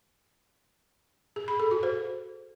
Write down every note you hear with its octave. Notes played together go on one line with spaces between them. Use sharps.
G#4
B5
A4
F#4
C5